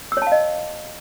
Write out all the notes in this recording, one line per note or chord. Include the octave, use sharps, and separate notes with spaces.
C#5 D#5 F5 A5 E6